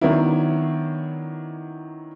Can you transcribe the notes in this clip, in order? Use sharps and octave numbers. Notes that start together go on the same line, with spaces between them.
D#3 F#3 B3 C#4 D4 E4